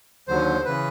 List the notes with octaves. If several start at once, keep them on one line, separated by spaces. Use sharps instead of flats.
D#2 D3 F#3 C5
C#3 E3 B4